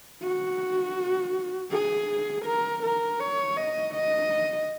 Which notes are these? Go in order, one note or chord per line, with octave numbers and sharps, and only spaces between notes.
F#4
G#4
A#4
A#4
C#5
D#5
D#5